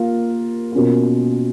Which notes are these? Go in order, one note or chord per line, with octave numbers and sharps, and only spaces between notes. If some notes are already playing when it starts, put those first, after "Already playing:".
Already playing: A#3 F4 A#4
B2 A#3 C#4 F4